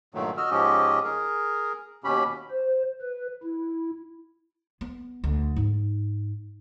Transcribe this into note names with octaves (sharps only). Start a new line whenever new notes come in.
G2 A#2 D#3 F#3 A3
F#4 D#5 E6 F6
G#2 F3 C#4 G4 D#5
G#4 A#4
D#2 B2 C#4 G4 B5
C5
B4
E4
B3
D2
G#2